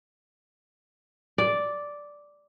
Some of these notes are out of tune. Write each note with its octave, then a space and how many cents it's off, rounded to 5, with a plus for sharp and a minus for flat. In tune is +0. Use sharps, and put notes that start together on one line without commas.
D5 -5